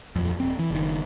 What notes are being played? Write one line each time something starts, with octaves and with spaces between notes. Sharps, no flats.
D#1 F2
D#1 C4
E3
F#1 D#3